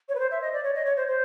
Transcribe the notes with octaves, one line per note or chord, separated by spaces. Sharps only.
C#5
B4
C5
E5
D#5
D5
C#5
D#5
C#5
C5
C5